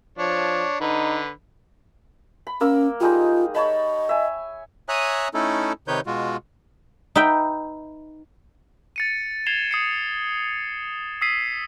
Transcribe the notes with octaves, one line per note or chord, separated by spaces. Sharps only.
F3 D4 C#5
D3 D#4 B4
B5
A#3 C#4 A#4 E6
G3 G#3 D#4 F4
C#5 D#5 A5 B5
E5 G#5
C#5 E5 G#5 A#5 D#6 F#6
A3 C#4 D#4 E4 A4
C3 D#3 D#4 B4 C#5 G6
B2 G#3 F4 F#4
D#4 B4 E5 G5
A6 C#7 D#7
G#6 C7 E7 F7 G7
D#6 C7 C#7
D#6 E6 B6 C7 D#7